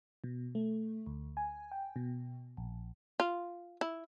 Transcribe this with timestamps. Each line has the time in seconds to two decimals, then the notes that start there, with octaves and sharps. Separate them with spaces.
0.24 B2
0.55 A3
1.06 D2
1.37 G#5
1.72 G5
1.96 B2
2.57 A#1
3.20 F4
3.81 E4